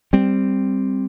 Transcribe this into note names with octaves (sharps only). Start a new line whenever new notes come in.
G3 C4